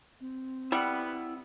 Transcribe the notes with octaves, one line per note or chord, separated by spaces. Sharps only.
C4
G3 B3 E4 F#5